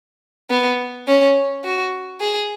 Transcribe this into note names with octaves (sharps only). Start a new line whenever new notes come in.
B3
C#4
F#4
G#4